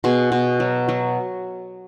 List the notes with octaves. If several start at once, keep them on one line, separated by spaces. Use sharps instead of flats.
B2 G#4
B2
F#3
F#3